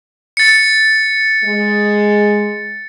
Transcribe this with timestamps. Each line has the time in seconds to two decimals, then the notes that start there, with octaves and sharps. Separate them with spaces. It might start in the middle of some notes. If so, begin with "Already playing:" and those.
0.37 A6 C#7
1.44 G#3